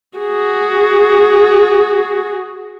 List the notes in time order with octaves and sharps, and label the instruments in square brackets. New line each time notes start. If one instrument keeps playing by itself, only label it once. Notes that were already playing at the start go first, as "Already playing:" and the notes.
[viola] F#4 G#4